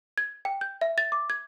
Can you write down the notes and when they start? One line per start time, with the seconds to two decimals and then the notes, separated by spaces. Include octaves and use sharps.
0.18 G#6
0.45 G5
0.61 G6
0.81 E5
0.98 A6
1.12 D6
1.30 G#6